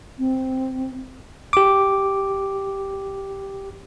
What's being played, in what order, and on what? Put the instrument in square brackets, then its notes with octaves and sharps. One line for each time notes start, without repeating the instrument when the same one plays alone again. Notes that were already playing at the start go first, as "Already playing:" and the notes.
[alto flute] C4
[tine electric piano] G4 D6